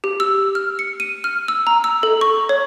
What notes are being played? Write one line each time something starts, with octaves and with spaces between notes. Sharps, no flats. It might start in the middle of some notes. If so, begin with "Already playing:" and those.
G4
E6
F6
C#7
D#7
F6
E6
A#5
E6
A4
C#6
C#5